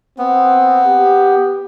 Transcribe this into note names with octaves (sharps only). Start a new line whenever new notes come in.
B3 C4
G4